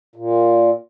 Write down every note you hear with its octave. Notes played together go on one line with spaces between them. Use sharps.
A#2